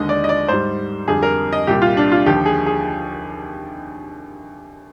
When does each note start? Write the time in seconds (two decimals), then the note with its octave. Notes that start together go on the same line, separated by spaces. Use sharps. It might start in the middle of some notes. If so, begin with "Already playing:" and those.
Already playing: D#2 D3 G#3 D#5
0.09 D5
0.24 D#5
0.29 D5
0.48 G#2 G3 C5
1.08 F2 D3 G3 G#4
1.23 A#4
1.53 D#5
1.67 C2 A#2 G3 G4
1.82 F4
1.97 D4
2.12 F4
2.26 D#2 D3 F3 G4
2.46 G#4
2.66 G#4